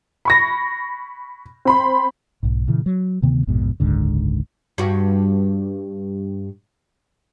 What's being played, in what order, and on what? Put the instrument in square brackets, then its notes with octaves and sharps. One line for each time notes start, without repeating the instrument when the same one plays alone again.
[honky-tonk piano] B5 C#6 A#6
C4 B5 C6
[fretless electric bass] B1 G#2
A#2 C#3 E3
F#3
D2 C3 D#3 B3
A#1 F2 G#2 B2
F#1 C#2 G#2 D3
[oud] G2 F#4